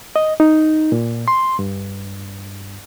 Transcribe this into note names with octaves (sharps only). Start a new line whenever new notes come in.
D#5
D#4
A#2
C6
G2